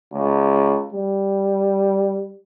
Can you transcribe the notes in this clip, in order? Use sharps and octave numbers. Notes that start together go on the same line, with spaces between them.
C#2
G3